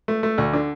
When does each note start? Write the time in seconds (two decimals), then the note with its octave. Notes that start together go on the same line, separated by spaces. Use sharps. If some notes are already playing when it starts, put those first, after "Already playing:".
0.08 A3
0.23 A3
0.38 D2
0.53 D3